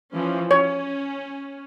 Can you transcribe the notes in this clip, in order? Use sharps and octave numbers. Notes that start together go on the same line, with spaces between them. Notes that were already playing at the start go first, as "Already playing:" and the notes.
E3 F3 C#4
C#4 C#5